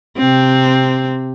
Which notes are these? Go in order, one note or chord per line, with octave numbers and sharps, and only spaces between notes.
C3 C4